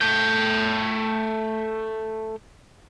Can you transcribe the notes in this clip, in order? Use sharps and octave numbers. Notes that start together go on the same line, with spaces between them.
A3 G5